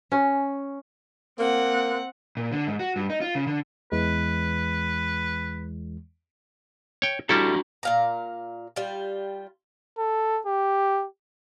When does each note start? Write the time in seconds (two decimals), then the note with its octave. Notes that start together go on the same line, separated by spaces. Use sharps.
0.12 C#4
1.39 A#3 C4 F#5
2.37 A#2
2.52 D3
2.67 G#2
2.80 F#4
2.96 G2
3.10 D#4
3.21 F4
3.35 C#3
3.47 D3
3.92 E2 E3 G#3 B4
7.02 C#5 G5
7.29 G3 D4 E4 F#4 A4 A#5
7.83 A#2 F5 A#5
8.76 G3 F4
9.98 A4
10.46 G4